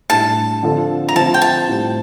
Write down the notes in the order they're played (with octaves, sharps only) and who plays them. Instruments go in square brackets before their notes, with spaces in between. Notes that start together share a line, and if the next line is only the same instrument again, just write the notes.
[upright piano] A2 G3 D4 [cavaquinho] A5
[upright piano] D3 F3 C4 F4 A4
[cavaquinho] A#5
[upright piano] F3 C4 F4 C5 [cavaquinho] A5
[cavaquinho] G5
A5
[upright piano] A2 G3 C4